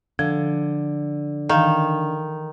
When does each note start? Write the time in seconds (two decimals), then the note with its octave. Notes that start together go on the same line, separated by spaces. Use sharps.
0.19 D3 F3
1.49 D#3 E3 F5